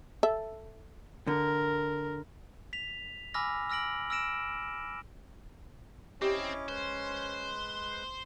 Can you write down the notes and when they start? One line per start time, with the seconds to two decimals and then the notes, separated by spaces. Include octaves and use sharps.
0.23 A4 E5
1.27 D3 A#4
2.73 B6 F7
3.34 G#5 B5 D6 E6 F6 A#6
3.70 E6 F6 A#6 D7 F#7
4.10 E6 F6 A#6 D7 E7
6.22 C4 C#4 E4 G4 D#5 D6
6.68 G#3 B4 C5